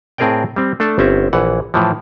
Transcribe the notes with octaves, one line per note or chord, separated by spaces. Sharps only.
A2 C4 G#4 A#4 D5 G5
G3 C4
A3 D4 A4 A5
G1 C4 C#4 E5
A#1 E3 F#5
A2 E3 F3